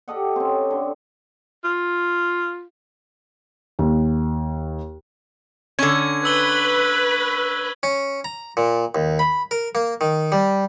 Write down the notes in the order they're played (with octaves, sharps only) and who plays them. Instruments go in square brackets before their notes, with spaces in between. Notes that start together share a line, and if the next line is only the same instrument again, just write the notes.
[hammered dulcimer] G4 A4 D#5 F#5
C4 C#4
D3
[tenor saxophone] F4
[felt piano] D#2
[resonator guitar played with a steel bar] D3 C#4 [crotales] C#6 G#6
[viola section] B4 [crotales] E6 G7
[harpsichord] C#4
A#5
A#2
D#2
B5
A#4
A#3
D#3
G3